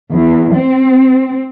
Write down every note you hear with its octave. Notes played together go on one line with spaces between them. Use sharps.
E2
C4